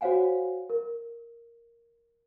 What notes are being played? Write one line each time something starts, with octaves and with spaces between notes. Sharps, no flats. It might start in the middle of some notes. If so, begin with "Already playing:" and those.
F#4 C5 C#5 F5 F#5 G#5
A#4